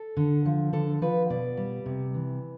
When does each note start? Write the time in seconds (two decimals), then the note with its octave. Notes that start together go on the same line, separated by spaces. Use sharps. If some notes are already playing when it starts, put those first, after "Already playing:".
Already playing: A4
0.17 D3
0.46 F3
0.73 D3 A4
1.02 F3 B4
1.30 B2 D5
1.57 G3
1.86 C3
2.14 E3